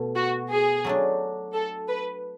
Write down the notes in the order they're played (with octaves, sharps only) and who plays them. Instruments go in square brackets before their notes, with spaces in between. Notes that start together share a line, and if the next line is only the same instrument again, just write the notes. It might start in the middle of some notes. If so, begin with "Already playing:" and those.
Already playing: [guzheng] B2 A3
[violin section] F#4
G#4
[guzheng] F#3 A3 D4
[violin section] A4
B4